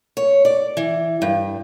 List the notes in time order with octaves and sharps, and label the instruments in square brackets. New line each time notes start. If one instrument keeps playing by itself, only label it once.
[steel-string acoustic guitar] C#5
D5
E3
G2